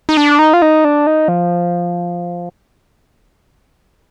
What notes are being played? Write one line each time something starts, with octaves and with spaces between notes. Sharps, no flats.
D#4
D4
D#4
F4
D#4
D4
D#4
F3